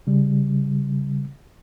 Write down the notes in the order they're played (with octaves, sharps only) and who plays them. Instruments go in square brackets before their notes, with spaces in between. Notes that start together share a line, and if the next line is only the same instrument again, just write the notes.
[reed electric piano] C#3 G3